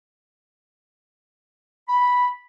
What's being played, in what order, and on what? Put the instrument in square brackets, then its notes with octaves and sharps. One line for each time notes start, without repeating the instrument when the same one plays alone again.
[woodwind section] B5